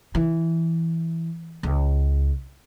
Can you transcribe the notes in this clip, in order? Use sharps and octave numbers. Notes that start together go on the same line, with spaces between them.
E3
C#2